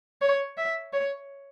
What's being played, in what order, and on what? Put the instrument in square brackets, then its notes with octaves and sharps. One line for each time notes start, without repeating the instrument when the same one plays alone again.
[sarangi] C#5
E5
C#5